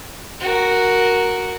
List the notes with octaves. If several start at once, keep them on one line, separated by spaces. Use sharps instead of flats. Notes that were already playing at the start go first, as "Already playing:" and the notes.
F#4 A#4